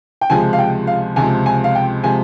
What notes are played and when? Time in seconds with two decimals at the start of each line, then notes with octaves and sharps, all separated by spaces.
0.21 G5
0.30 C#2 C3 F3 G#3 G#5
0.53 F5
0.59 G5
0.87 F5
1.16 C#2 C3 F3 G#3 G#5
1.46 G#5
1.64 F5
1.75 G5
2.04 C3 F3 G#3 G#5